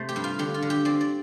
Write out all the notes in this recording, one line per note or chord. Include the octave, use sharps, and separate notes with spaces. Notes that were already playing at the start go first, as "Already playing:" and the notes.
Already playing: C3 A3 C5
G4
G2
F4
D3 G4
F4
D3
G4
C4 D5
D5